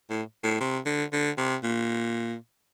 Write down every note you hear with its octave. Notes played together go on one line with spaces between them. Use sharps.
A2
A2
C3
D3
D3
C3
A#2